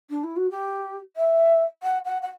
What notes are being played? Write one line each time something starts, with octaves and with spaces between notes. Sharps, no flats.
D4
E4
F#4
G4
E5
F#5
F#5
F#5